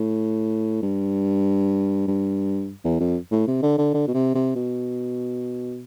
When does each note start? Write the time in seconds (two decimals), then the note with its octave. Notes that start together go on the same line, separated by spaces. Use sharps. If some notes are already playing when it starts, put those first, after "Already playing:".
Already playing: A2
0.82 G2
2.07 G2
2.85 E2
3.00 F2
3.31 A2
3.47 C3
3.63 D3
3.78 D3
3.94 D3
4.08 B2
4.14 C3
4.35 C3
4.55 B2